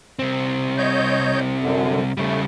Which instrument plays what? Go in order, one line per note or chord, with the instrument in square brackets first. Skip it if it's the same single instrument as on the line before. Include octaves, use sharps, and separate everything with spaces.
[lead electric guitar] C2 C4
[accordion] C#5 D#5 G6
F#2 D3
[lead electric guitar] C#3 G3 [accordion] A3